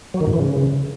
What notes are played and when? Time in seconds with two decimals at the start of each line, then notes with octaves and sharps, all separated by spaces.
0.14 F#3
0.21 D#3
0.27 G#2
0.33 E3
0.40 C#3